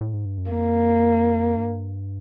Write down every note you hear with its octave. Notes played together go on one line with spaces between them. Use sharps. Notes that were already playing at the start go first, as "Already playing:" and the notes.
A2
G#2
G2
F#2
F2 A#3
G2